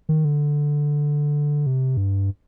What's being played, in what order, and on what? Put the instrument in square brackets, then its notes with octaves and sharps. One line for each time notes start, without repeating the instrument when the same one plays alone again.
[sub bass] D#3
D3
C3
G2